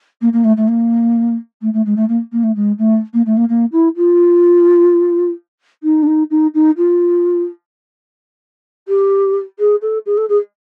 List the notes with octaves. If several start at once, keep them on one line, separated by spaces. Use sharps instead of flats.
A#3
A#3
A3
A3
A#3
A3
A3
G#3
A3
A#3
A#3
A3
G#3
A3
A#3
A3
A#3
A#3
E4
F4
D#4
D4
D#4
D#4
D#4
F4
G4
G#4
A4
G#4
A4
G#4